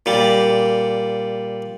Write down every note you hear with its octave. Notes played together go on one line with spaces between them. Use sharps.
A#2 G3